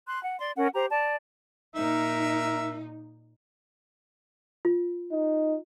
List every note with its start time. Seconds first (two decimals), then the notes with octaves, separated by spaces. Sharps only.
0.07 C6 F#6
0.22 F#5
0.40 D5 C6
0.57 C#4 A#4 F#5
0.74 G4 C5 A#5
0.90 D5 A5
1.76 A#2 D#4 A#4 E5
4.65 F4
5.12 D#4